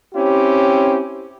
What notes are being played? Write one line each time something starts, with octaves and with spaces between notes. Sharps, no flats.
C4 C#4 E4 G4